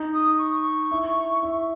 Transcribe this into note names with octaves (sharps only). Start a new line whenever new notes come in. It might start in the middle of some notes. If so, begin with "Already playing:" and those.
Already playing: D#4
D#6
C#6
E4
E4